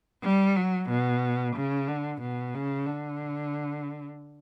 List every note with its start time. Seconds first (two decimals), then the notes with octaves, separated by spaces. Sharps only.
0.24 G3
0.56 F#3
0.89 B2
1.56 C#3
1.88 D3
2.21 B2
2.54 C#3
2.86 D3